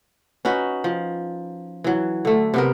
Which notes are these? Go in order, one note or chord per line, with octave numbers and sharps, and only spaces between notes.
C#4 D#4 F#4 B4
F3
E3 F#3
D3 A3
C3 B3 A#4